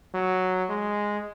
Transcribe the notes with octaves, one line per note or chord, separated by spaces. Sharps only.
F#3
G#3